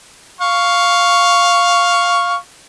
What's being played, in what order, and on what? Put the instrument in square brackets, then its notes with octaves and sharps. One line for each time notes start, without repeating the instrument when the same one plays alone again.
[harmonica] F5 C#6